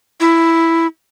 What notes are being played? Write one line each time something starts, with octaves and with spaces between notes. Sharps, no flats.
E4